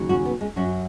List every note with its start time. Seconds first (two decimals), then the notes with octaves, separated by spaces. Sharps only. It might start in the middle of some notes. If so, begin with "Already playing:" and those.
Already playing: D#2 C#3 F#3
0.09 C#4 F#4
0.25 B3
0.41 G#3 C#4
0.56 F#2 F#3 C#4 F#4